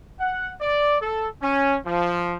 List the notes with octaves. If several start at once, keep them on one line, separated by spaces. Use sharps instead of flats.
F#5
D5
A4
C#4
F3